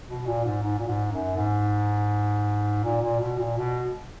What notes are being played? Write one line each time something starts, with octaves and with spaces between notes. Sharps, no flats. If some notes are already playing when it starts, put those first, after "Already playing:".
B2
A#2
G#2
G#2
A#2
G#2
F#2
G#2
A#2
A#2
B2
A#2
B2